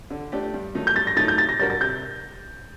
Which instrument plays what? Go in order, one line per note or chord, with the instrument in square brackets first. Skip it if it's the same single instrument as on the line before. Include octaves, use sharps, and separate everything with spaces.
[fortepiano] D3
A3 D4 G4
G2
D#3 F#3 A3 D#4
[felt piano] G6
[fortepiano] G2 [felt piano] A6
[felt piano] A#6
[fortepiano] D#3 F#3 A3 D#4 [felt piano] A6
[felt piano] G6
[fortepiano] C3 [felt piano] A6
[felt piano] A#6
[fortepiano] G3 D4 F#4 A#4 [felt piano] A6
[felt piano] A6
[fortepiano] C3 [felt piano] G6